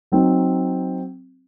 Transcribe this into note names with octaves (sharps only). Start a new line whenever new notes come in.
F#3 C4 D#4